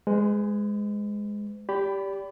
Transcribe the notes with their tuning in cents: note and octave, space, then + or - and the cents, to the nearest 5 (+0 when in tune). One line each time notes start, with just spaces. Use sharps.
G#3 -5 B4 +45
G4 +0 D5 -25 B5 +15